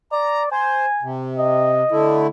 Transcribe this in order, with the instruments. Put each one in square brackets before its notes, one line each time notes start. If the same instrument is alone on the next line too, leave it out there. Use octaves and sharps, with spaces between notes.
[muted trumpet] D5 [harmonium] A#5
[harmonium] C5 [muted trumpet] G#5
[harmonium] C3
[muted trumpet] D#5
[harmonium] D3 A3 E4